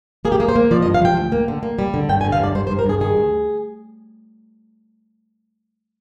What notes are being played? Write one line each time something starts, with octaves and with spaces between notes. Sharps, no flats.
A#3 G#4
G4
A#3 G#4
C5
A#3
F3 D5
D#5
G2
F5
F3 G5
D2
A#3
D3
A#3
G3
D3
G2 G5
G#5
D3
F5
G2 D5
G2 C5
C5
G2
A#4
G2 G#4
D#3 G#4
D2